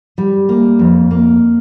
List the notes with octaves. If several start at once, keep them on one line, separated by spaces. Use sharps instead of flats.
G3
A#3
F2
A#3